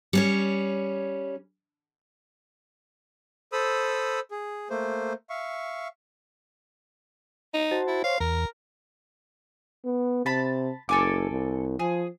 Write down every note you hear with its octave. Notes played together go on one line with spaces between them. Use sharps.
G3 C#4 C#5
A4 C5 B5 D#6 E6
G#4
A3 A#3 C5
E5 F5 C#6
D#4
F#4 C5 A5
E4
C5 C#5 F5
E2 A#4
B3
C3 A5 B5
F#1 A4 G#5 D6
C2
F3 G#4